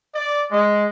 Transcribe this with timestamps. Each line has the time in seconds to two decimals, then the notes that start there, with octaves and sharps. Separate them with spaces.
0.13 D5
0.50 G#3